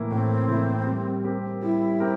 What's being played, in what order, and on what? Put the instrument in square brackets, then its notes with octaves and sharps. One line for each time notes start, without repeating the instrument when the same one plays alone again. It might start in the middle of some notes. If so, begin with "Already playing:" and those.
Already playing: [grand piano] A2 E3 A#3 E4
[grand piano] A2 [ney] C4
[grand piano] E3 A#3 E4
G3
C4 G4 A#4
[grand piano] G3 [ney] E4
[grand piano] C4 G4 A#4